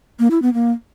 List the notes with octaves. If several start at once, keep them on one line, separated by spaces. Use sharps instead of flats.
A#3
E4
B3
A#3